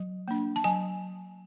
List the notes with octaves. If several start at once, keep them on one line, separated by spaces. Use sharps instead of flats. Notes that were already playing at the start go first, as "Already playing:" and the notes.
Already playing: F#3
A#3 D4
A5
F#3 G#5